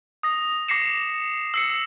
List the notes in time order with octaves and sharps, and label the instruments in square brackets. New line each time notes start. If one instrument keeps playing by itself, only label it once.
[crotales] D#6 A#6
D6 A#6 C7 C#7 E7
E6 C7 C#7